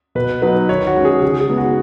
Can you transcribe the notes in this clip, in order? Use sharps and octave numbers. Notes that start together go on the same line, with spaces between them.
B2 B4
F#3 B3 D#4 B4
D#3 C#5
F#4
G#3 C#4
G#4
C#3 G#4
G#4
G#3 B3 D#4
F#4